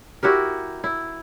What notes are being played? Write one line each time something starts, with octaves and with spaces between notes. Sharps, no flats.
E4 F#4 G4 A#4
E4